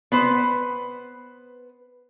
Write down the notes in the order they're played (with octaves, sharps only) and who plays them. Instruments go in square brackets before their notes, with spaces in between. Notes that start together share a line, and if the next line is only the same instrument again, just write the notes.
[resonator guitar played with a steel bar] B3 B4 C5